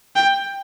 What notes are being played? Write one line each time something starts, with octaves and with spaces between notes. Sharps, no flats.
G5